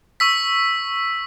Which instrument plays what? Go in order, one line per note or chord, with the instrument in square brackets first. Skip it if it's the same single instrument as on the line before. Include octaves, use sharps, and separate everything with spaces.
[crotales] C#6 E6 B6